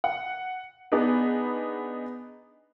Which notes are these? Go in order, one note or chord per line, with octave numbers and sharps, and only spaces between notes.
F#5
B3 D4 D#4 G#4 B4